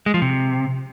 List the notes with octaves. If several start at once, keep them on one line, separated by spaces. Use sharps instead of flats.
G#3
F3
C3